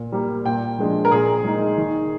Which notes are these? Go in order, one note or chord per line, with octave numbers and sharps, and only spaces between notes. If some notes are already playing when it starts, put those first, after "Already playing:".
Already playing: A#2
G3 A#3
A#2 G5
F3 G#3 D4
A#4
A#2 G#4
G#3 D#4
D#3